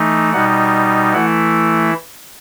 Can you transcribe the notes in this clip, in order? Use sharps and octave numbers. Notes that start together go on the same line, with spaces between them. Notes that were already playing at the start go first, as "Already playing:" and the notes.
Already playing: E3 A3 D#4
B2 G3 D#4 F#5
E3 A3 E4 F#5